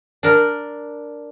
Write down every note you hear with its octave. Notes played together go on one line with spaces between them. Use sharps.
D4 A#4